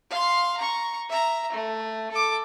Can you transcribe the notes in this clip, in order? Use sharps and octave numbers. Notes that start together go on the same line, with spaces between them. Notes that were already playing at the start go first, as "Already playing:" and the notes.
F5 C6
A#5 C#6
E5 A#5
A3
A4 D6